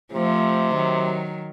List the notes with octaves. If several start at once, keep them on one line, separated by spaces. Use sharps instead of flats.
C3 F3 A3
D#3 F#3